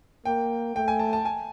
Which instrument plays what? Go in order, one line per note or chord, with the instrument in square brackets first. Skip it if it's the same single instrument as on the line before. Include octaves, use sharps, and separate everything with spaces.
[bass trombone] A#3 [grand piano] G5
[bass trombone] A3 [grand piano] G5
[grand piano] G#5
A5
A5
G#5